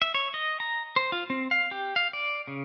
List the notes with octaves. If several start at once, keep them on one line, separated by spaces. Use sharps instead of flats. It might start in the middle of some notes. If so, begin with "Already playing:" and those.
E5
C#5
D#5
A#5
C5
F4
C4
F5
G4
F5
D5
C#3